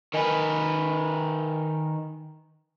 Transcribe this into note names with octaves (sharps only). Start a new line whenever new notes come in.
D#3 A#4 B4 D#5 G#5